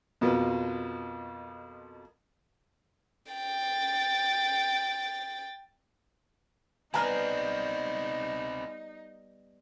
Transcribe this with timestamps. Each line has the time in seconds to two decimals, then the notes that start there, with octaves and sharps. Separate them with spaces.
0.21 F2 B2 F3 A#3 B3
3.32 G5 A6
6.94 G3 B3 C4 D#4 E4 G#5 A#5 F6